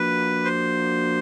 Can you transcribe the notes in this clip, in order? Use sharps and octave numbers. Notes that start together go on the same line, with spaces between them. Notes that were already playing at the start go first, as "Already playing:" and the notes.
Already playing: F3 A#3 D4 F#4 B4
C5